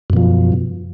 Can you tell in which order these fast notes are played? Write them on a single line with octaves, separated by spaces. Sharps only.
F#2 B2 F3